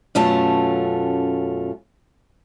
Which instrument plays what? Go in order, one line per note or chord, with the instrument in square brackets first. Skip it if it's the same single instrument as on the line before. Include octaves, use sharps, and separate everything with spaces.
[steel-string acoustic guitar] F#2 B2 A3 C#4 F4 A5